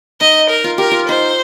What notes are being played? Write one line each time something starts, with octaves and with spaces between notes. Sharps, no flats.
D#4 D#5
A#4
F4
G4 A#4
F4
D#4 C5